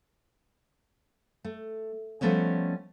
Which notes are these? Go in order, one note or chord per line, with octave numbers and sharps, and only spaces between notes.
A3
F3 G3 A3 B3 C#4 D#5